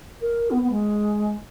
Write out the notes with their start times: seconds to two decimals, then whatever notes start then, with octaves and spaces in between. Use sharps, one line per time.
0.21 A#4
0.51 B3
0.62 B3
0.71 G#3